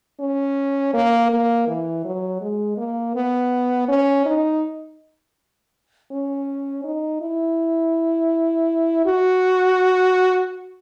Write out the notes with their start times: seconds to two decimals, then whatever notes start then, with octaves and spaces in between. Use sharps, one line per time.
0.20 C#4
0.94 A#3
1.31 A#3
1.68 E3
2.05 F#3
2.41 G#3
2.78 A#3
3.16 B3
3.89 C#4
4.26 D#4
6.12 C#4
6.84 D#4
7.21 E4
9.06 F#4